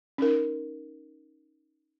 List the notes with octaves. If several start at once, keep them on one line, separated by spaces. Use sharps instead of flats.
C#4 D#4 A#4